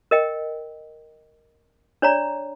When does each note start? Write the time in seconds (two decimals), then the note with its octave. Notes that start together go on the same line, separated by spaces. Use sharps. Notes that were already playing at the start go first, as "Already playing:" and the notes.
0.11 A#4 D#5 G5
2.02 D4 C#5 D5 A#5